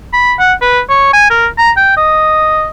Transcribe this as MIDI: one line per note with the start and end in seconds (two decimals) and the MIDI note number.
0.13 0.34 83
0.39 0.53 78
0.61 0.80 71
0.89 1.09 73
1.13 1.30 80
1.30 1.47 70
1.58 1.71 82
1.76 1.93 79
1.97 2.68 75